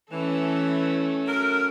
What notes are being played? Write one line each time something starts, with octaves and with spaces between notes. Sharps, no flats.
E3 A3 C#4
F#3 A#4